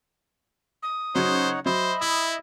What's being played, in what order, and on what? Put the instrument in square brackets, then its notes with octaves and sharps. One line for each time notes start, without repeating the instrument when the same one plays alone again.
[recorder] D#6
[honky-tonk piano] C#3 F#3 C#4 [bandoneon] D#4 C#5 F#5 [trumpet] C5
[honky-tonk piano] F#3 [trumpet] C5 [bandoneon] D#5 E5 [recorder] B5
[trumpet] E4 [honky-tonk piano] D#6